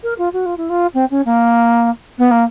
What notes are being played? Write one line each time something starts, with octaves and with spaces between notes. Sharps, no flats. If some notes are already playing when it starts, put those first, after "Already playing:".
A#4
F4
F#4
F4
E4
F4
C4
C#4
A#3
B3
A#3